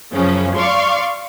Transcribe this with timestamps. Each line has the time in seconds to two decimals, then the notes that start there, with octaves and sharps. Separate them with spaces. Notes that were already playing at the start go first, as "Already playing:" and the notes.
0.12 F#2 C#3 F3 C#4
0.56 D5 F5 C6 C#6